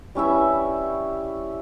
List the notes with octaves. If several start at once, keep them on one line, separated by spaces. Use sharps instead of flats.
G3 C#4 E4 E5